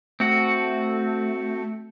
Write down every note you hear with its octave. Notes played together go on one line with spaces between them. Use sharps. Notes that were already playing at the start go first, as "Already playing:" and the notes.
A3 C4 F#4